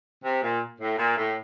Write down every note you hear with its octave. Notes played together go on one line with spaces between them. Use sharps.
C3
A#2
A2
A#2
A2